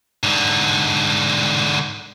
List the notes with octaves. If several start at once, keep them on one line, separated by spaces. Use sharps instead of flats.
G#2 D3